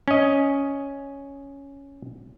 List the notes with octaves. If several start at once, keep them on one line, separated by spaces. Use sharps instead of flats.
C#4 D#5